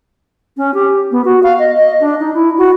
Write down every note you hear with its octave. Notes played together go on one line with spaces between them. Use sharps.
C#4
G4
B3
F#4
F5
D#5
D#5
D4
D#4
E4
F#4